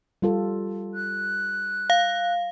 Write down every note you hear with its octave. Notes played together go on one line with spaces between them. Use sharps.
G3 F4 A4
F#6
F5